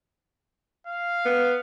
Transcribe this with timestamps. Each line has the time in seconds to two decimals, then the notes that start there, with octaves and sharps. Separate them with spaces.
0.87 F5
1.25 B3